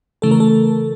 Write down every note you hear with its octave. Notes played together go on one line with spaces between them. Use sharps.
C#3 E3 A3 A4
A#4
A4